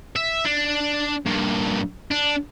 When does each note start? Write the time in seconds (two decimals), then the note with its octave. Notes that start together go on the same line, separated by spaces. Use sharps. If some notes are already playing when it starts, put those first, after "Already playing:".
0.16 E5
0.45 D4
1.26 G2 A#2
2.11 D4